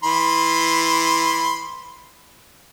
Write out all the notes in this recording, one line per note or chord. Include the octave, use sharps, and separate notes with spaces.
E3 B5 C6